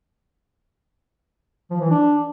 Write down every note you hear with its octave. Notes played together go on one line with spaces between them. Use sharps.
F3
E3
D4